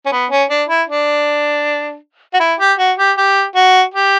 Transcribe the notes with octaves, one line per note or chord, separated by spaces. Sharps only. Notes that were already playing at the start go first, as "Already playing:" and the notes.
C#4
B3
C#4
D4
E4
D4
F#4
E4
G4
F#4
G4
G4
F#4
G4